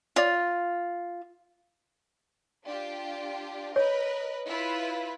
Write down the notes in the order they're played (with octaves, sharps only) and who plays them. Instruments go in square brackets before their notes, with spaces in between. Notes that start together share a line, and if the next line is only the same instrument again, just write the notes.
[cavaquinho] F4 [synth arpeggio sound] C#5 D5
[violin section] D4 F4 G4
[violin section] A#4 B4 D#5 [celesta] C#5
[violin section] E4 F4 B4